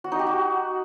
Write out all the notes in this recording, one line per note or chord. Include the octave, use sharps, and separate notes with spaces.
F#4
D#4
G4
F#4